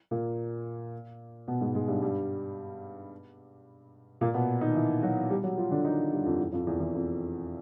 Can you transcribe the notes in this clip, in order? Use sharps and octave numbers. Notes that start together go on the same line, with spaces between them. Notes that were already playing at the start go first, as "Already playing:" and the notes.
A#2 A#3
B2 B3
G#2 G#3
G#2 G#3
G2 G3
G2 G3
A#2 A#3
B2 B3
D#3 D#4
E3 E4
F#3 F#4
G3 G4
F#3 F#4
F3 F4
D3 D4
D#3 D#4
G2 G3
F2 F3
E2 E3
F2 F3
E2 E3
E2 E3
F2 F3